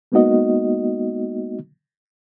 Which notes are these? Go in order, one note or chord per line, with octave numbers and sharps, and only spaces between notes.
G#3 A#3 B3 D#4 F#4 D#5